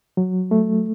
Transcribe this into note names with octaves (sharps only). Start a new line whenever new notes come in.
F#3
A3